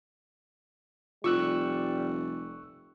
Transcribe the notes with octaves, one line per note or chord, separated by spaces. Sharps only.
F1 G3 F4 C#6 E6 F#6